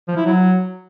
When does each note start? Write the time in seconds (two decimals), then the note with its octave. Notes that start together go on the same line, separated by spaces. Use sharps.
0.08 F3
0.17 E4
0.26 F#3